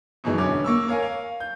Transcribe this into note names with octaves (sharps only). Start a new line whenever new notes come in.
F#2 B2 D#3 E3 G#3
E1 D3 C#4 D6
A#3 C#6 E6
A#4 C#5 F5 G#5
F5
G6